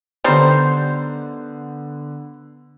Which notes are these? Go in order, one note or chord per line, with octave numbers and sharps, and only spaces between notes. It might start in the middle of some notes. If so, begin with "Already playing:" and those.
D3 G3 B3 D#4 C5